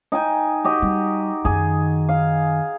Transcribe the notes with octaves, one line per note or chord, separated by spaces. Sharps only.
D#4 G5 G#5
F#4 G4 D#5
G3
F#2 D#3 G#4
F5